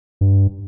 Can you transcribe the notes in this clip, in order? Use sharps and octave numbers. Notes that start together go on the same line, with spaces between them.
G2